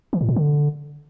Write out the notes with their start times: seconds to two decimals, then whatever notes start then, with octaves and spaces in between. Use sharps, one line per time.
0.13 E3
0.21 A2
0.29 A#2
0.36 D3